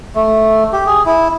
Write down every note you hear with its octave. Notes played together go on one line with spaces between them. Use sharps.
A3
G4
G#4
E4